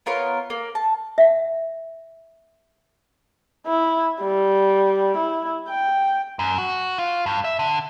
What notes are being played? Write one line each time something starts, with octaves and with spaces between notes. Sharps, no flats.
B3 F4 A#4 C#5
A#3
A5
E5 F#5
E4
G3
E4
G5
F#2
F#4
F4
G2
E5
D3